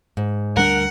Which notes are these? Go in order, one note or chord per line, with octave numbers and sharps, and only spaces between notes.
G#2
D2 G3 D4 A#4 F#5